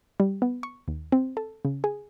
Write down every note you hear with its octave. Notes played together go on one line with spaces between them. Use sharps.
G3
B3
C#6
D#2
C4
A4
C#3
G#4